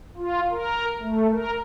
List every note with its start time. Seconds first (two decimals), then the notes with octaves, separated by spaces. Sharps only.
0.17 F4
0.50 A#4
1.01 A3
1.32 A#4